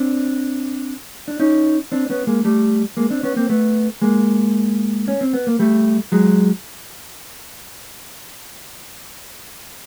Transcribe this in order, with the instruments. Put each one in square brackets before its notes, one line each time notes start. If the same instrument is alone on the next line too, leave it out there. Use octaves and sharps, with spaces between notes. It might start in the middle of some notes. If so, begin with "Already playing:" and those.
Already playing: [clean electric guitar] C4 D4
D4
C#4 D#4
C4 D4
B3 C#4
G#3 A#3
G3 A3
G#3 A#3
C4 D4
B3 C#4
A#3 C4
A3 B3
G#3 A#3
C#4
C4
B3
A#3
G3 A3
F#3 G#3